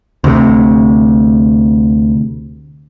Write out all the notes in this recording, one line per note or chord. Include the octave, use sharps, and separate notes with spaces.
D2 C3